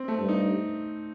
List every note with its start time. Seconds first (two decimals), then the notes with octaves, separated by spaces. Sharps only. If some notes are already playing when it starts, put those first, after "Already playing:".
Already playing: C4
0.08 A3
0.18 G2
0.28 D#4